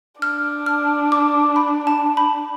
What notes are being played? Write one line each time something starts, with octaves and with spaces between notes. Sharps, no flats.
D4 F6
F6
D6
B5
A5
B5